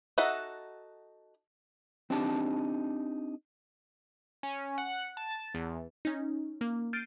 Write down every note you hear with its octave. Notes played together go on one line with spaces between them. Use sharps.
D#4 F#4 A4 E5 F#5
C4 D4 D#4 G4 A5
C#4
F#5
A5
E2
C#4 D#4
A#3
F6 G6 A6 C7 D7 D#7